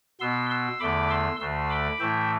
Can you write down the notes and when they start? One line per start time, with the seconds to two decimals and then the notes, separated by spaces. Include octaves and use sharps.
0.20 B2 B3 C6 E6
0.50 C6 E6
0.80 E2 D3 A3 B5 D6
1.10 C6 E6
1.40 D2 D3 A3 C6 E6
1.70 B5 D6
2.00 A2 E3 A3 E5 G5